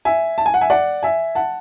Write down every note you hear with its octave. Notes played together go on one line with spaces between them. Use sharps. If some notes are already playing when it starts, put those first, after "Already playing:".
E5 G#5
A5
G#5
F#5
E5 G#5
D5 F#5
E5 G#5
F#5 A5